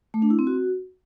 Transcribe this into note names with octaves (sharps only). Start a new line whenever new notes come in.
A3
D4
E4
C4
F#4